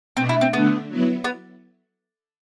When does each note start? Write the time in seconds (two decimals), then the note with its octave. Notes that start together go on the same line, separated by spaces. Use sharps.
0.17 B2 A3 C4 D4
0.29 E4
0.41 C4
0.53 D3 A3 B3 D4
0.88 F#3 B3 E4
1.24 B3